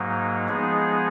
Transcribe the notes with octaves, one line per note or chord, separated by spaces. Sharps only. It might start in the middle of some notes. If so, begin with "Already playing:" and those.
Already playing: G#2 F#3 A#3 D#4
F3 G#3 B3 D#4 G#4